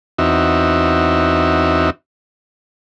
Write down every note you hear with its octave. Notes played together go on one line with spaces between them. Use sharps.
E2 C4 D#4 F#4 E5